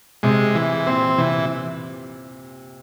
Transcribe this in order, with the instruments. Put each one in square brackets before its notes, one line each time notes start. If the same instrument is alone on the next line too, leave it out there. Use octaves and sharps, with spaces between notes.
[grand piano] C3 [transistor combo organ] G#3
[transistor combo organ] E3
[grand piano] A#2 [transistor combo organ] C4
[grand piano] C3 [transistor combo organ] E3